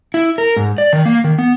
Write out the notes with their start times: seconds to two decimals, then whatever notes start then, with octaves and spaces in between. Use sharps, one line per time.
0.14 E4
0.38 A#4
0.56 G#2
0.78 D5
0.93 D#3
1.06 A#3
1.24 D#3
1.38 B3